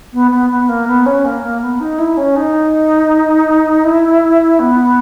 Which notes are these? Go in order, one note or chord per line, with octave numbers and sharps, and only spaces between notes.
B3
B3
B3
A#3
B3
C#4
A#3
A#3
B3
D#4
E4
C#4
D#4
E4
B3